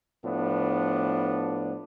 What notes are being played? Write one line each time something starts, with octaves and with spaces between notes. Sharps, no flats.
A2 F3 B3 D4